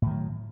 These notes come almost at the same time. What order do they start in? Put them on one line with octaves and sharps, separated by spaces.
A2 D#3 F#3